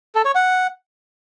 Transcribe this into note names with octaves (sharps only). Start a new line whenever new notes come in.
A4
C#5
F#5